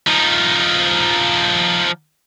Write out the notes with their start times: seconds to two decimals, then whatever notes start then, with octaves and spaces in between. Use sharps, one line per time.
0.07 F3 D#4